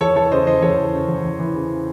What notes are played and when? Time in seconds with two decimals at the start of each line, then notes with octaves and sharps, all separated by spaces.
0.01 E2 A4 C#5
0.16 E3 A4 C#5
0.31 C#3 C5 D#5
0.47 E2 C5 D#5
0.62 E2 A4 C#5
0.77 E3
0.93 C#3
1.08 E2
1.24 E2
1.39 E3
1.54 C#3